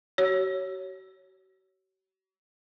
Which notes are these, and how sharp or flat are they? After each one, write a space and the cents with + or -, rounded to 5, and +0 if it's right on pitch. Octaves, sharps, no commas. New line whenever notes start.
F#4 +40 C#5 +0